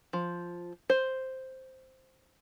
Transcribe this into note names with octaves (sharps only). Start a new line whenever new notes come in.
F3
C5